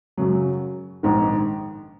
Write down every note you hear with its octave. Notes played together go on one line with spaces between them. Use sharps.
F#2 C#3 F#3
A#1 G#2 D#3